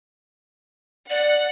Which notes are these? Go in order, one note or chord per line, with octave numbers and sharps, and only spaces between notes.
D5 F#5